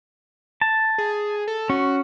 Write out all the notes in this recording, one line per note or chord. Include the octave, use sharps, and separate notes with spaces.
A5
G#4
A4
C#4 F#4